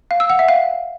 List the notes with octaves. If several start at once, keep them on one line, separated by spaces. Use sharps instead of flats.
F5
E6
F#5
E5
F5